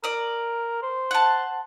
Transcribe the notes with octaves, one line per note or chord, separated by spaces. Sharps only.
A#4 D5 D#6
C5
F#5 A5